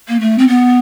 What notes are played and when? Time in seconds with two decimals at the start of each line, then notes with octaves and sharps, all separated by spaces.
0.08 A#3
0.20 A3
0.38 C4
0.48 B3